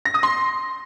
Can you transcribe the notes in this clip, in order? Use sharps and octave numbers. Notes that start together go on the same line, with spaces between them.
A#6
D#6
C6